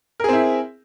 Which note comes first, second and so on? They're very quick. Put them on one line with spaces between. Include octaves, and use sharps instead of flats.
A#4 G#4 C4 E4